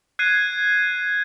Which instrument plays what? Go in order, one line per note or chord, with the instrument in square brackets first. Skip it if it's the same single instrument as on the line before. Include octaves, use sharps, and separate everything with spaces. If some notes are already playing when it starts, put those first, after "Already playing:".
[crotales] F#6 G#6 C7 D#7